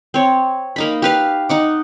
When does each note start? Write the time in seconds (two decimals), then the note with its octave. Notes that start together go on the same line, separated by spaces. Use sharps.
0.14 C4 C#5
0.76 A#3 D#4 B5
1.02 G4 B4 F5
1.49 D#4 F#5 D6